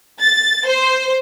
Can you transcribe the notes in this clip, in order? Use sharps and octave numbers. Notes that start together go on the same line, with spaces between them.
A6
C5